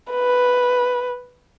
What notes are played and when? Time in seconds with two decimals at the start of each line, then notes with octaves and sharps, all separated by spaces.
0.12 B4